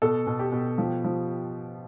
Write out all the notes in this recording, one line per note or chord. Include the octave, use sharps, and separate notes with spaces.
B2 A4
B2
G4
B2
F3
F3